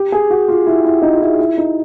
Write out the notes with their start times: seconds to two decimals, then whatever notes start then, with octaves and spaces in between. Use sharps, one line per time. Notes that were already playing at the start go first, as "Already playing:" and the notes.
Already playing: G4
0.12 G#4
0.30 F#4
0.48 F4
0.67 E4
0.85 E4
1.02 D#4
1.13 F4
1.20 E4
1.40 E4
1.58 D#4